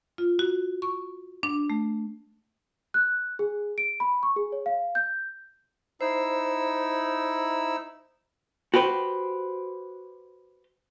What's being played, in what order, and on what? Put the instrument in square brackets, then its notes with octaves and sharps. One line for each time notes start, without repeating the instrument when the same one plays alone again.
[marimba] F4
F#4
C#6
D4
A3
[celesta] F#6
G#4
D7
B5
C#6
G#4
C#5
F5
G6
[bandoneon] D#4 E4 E6 [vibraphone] C5
[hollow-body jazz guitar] F#4 G4 B4 C5